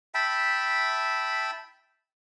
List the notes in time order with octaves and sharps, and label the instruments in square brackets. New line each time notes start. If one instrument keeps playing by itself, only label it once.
[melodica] E5 G5 A5 B5